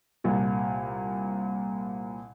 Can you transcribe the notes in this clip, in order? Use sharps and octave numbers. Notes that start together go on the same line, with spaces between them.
C2 A#2